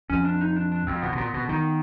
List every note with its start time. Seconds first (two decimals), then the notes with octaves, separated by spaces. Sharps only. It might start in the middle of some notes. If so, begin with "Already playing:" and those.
0.10 F2 C#4
0.25 D4
0.41 D#4
0.56 D4
0.72 D4
0.87 F2 C4
1.02 B2 B3
1.12 B2
1.17 A#2 B3
1.34 B2
1.49 D#3